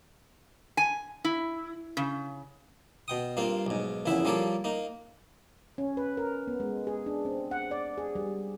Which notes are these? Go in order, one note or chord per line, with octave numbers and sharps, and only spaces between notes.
G#5
E4
C#3
B2 G5 D#6
G2 A#3 C4 F4
B1 G#2
A#1 E2 C#3 E4 E5 F#5
F3 G3 A#3 A4 C#5 D5
A#3 D#4
C#4
B4
A#4
B3
G#3
G#4
D4
C4
F#5
D5
G#4
G3